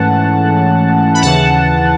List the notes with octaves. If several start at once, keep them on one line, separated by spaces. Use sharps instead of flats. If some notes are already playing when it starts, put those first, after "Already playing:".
Already playing: G#2 E3 A3 C#4 F#5 A5
B5
D#2 C#3 E3 F#5 A5